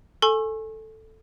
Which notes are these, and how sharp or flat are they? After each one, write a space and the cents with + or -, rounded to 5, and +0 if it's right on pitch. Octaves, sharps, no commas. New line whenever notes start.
A4 +0 G#5 +10 C#6 -35